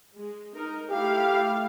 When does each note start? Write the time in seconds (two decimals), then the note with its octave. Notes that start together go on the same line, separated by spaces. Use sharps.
0.16 G#3
0.56 D#4 A#4
0.91 A3 E4 G4 F5